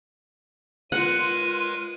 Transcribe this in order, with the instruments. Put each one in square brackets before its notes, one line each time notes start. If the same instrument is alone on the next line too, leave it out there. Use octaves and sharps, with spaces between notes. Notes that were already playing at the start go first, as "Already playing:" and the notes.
[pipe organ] G#3 A#4 B4 [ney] F4 [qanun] F#5 [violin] D#7